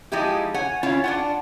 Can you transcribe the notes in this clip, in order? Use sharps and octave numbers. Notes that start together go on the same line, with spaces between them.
F3 G#3 D#4 E4 G4
C#5 F#5 G#5
C#4 E4 F4 C#5
D4 F4 F#5